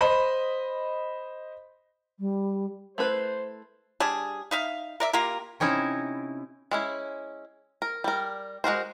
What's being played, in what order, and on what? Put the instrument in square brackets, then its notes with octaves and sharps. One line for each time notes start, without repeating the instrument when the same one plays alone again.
[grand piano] C5 D#5 B5
[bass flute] G3
[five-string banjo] A3 E4 B4 [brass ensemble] C5
[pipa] G3 D4 G#4
D#4 E5 F5
A#4 D5 E5
A#3 F4 G4 A#4
[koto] C3 C#4 D#4 E4
[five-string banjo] G#3 C#4 E4
A#4
G3 A#4
G#3 F#4 A#4 C5